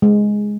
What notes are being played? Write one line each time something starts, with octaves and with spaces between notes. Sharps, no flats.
G#3